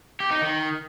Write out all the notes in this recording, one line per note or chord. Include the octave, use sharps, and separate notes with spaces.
G4
D#4
D#3